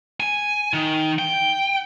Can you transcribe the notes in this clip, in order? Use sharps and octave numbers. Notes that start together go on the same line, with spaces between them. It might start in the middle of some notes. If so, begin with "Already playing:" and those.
G#5
D#3
G5